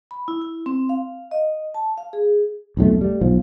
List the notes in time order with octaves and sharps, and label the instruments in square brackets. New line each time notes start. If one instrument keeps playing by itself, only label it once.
[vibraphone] B5
E4
E4
C4
F5
D#5
A5
F5
G#4
[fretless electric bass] B1 F2 F#3 A3
G3 A3
B1 F3